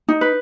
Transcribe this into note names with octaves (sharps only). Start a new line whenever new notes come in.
D#4
B4